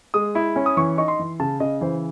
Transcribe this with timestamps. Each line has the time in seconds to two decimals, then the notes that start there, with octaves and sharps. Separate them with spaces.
0.14 G#3 D#6
0.35 E4
0.56 C#4
0.66 D#6
0.77 E3 C#6
0.98 D#4 C#6
1.08 C6
1.19 E3
1.40 C#3 A5
1.60 C#3 D#5
1.81 E3 C5